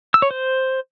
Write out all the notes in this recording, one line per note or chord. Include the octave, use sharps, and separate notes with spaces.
E6
C#5
C5